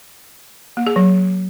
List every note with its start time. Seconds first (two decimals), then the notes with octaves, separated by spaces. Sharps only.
0.77 A#3
0.87 G#4
0.96 F#3